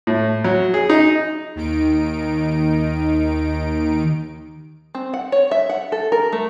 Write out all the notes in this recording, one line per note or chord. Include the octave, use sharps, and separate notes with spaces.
A2
F#3
G#4
D#4
D#2 D#3 D#4 D7
C4
F#5
C#5
E5
F#5
A4
A#4
A3